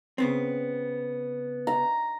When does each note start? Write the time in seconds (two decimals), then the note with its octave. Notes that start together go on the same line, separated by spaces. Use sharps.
0.18 C#3 B3 C4
1.67 A#5